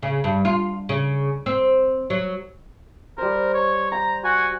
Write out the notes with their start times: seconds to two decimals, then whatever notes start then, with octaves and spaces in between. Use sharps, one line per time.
0.03 C#3
0.24 G2
0.45 F4
0.89 C#3
1.46 C4
2.10 F#3
3.18 G3 A#4 C5
3.54 C#5
3.92 G5 A#5
4.24 F#4 G#5